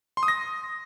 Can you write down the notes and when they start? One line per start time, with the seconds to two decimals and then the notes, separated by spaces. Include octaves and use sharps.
0.17 C6
0.23 D#6
0.28 A#6